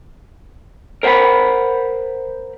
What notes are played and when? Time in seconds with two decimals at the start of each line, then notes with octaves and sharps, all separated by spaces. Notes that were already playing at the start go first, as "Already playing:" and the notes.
1.03 A#4 C5 F#5 G5 B5